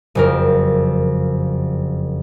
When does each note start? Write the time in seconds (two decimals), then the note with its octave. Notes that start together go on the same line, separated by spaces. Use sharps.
0.15 F#1 F2 A#4